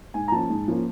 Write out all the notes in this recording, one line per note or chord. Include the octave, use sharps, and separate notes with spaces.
G#2 G#5
A#5
F3 A#3 C#4 A5
G#2
F3 A#3 C#4